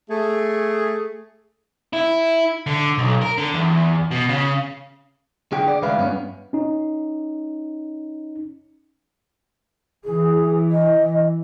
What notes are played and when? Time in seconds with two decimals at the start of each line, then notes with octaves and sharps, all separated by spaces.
0.09 A3 G#4
1.93 E4
2.67 D3
2.98 B1
3.22 A#4
3.38 D3
3.54 E2
4.11 B2
4.29 C#3
5.52 D3 G#4 F#5 G5
5.68 D5
5.82 D2 G#3 B4 E5 F5 B5
5.98 G2 B3 C#4
6.53 C#4 D#4
10.05 E3 G#4
10.71 D#5